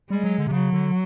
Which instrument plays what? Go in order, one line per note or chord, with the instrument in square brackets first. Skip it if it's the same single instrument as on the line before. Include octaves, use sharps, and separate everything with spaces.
[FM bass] G3 [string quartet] G#3
[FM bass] F#3
D3
C3
[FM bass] C#3 [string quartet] F#3
[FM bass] D3